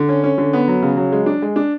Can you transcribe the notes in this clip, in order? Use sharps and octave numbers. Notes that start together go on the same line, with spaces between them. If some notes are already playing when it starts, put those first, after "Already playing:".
Already playing: D3
C#4
C#4
D3
B3
F#3
C#3
F#3
G#3
D4
G#3
D4